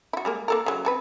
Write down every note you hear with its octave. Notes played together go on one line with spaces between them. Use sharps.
E4 F#4
G3 G#3 A#3
A#3 A4 A#4
C#3 F#3
C4 A4 B4